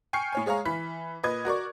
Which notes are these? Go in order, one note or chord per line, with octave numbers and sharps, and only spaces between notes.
G5 G#5 C#6 F6 C7 C#7
A2 C#5 G#5
G#3 G#4 C#5 F5 A#5
E3 B5 B6
A#2 B4 D#5 G#6
F#4 A#4 D5 C#6